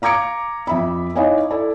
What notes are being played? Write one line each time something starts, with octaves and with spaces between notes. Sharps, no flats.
F5 A#5 D6 G#6 C#7 D7
F2 E5 B5
D#4 E4 C#5 D#5 F5 G#5
E4 A4 D5